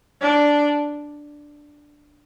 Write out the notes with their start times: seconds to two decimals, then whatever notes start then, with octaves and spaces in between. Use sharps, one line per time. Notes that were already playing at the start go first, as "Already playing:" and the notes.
0.21 D4